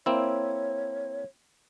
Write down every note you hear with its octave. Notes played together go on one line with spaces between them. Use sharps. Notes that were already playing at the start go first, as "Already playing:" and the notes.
A#3 C4 E4 C#5